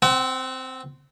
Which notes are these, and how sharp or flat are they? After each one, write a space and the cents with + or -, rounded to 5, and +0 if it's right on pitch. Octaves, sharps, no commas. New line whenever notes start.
C4 -5 F#5 +40